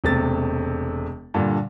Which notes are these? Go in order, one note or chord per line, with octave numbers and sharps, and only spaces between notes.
E1 C3 A3 A6
G2 A#2 D3